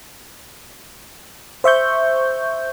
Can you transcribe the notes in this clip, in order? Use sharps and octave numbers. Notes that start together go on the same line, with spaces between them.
C5 E5 C#6 G6